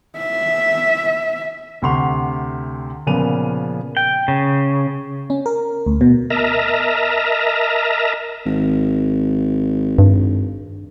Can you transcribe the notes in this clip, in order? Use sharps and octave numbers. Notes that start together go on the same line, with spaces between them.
E5
D2 C3 F#5 C6 C#6 F7
A#2 C#3 F3 B3 D#7 F7
G5
C#3
C#4
A#4
D2
B2
A#4 D#5 E5 A5 A#5
G#1
G2